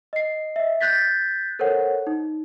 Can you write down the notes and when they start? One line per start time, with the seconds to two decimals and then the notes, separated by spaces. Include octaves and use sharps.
0.13 D#5 C7
0.56 D#5 E5
0.81 F#6 G6 A6 B6
1.59 A4 A#4 C5 C#5 F#5
2.07 D#4